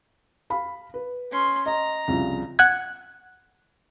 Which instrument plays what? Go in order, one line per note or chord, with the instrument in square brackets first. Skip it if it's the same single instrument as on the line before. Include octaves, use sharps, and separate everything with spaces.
[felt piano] F5 B5
B4
[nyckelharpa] C#4 C6
[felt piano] D#5 [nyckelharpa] A#5
[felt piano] C2 C#3 F3
[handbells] F#5 F#6 G#6